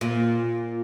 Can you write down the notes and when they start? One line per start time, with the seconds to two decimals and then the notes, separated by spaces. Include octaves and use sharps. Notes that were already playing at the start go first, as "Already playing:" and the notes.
0.01 A#2